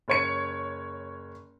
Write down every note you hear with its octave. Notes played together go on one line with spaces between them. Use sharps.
F#1 C#5 C#7